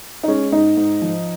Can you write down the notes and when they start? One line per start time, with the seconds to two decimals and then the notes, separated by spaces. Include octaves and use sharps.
0.23 D#4
0.28 G#3 C#4
0.52 G#2 D#4
0.77 G#2
1.02 F3